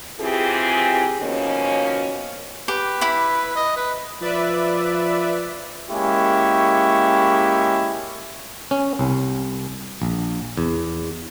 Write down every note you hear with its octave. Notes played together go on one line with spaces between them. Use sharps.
E3 C4 F4 G4 G#4
B2 D#3 F3 A#3 C#4
G4 B4
E4 B5
D#5
B4
F3 B4 D5 E5
G#3 A#3 C#4 E4 G4 C#6
C#4
C2
A#1
E2